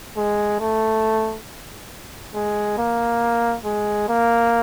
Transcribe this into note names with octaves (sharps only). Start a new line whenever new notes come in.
G#3
A3
G#3
A#3
G#3
A#3